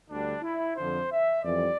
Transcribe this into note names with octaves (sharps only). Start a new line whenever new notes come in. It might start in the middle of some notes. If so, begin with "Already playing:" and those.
D2 D3 G3 D4
E4
F2 D3 F3 C5
E5
F2 E3 G3 D5